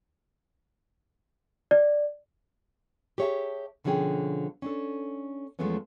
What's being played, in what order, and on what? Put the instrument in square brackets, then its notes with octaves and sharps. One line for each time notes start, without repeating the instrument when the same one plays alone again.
[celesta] D5
[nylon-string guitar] G4 G#4 C#5 D5 E5 A5
B2 D3 F3 C#4 G#4 G5
C#4 D4 A4
E2 F3 G#3 A3 B3 C#4